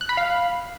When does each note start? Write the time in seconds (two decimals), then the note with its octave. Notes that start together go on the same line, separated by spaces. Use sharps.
0.01 F#6
0.09 B5
0.17 F5